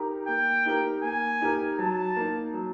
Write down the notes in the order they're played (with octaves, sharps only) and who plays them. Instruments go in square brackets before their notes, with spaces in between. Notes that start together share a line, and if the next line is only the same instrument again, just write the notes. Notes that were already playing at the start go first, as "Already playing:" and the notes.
Already playing: [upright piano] D#4 G4 A#4
[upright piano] A#3 [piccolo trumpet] G5
[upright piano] D#4 G4 A#4
[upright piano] A#3 [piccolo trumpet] G#5
[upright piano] D#4 G4 A#4
[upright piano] F#3 [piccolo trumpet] A5
[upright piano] A#3 D#4
F#3